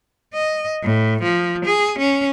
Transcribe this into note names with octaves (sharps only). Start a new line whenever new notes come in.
D#5
A2
F3
G#4
C#4